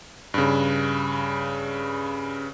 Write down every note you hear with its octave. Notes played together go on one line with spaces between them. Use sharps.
G2 C#3